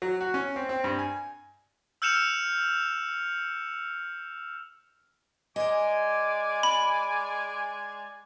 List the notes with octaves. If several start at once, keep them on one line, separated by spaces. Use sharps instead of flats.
F#3
F#4
C#4
C4
C4
G2
G#5
E6 F6 G6 C#7 E7 F7
G#3 D5 D#5 G#5 A#5 D6
B5